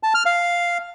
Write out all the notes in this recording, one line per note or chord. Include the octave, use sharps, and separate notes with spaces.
A5
F6
F5